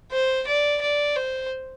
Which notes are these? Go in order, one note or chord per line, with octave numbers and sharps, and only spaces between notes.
C5
D5
D5
C5